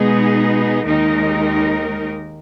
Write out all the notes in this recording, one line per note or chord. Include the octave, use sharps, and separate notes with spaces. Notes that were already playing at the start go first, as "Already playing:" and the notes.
Already playing: B2 G#3 B3 D#4 G#4
D#2 D#3 G#3 D#4 A#4